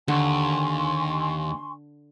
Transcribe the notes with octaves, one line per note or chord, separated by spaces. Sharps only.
D#2 D3 G#5 C6 C#6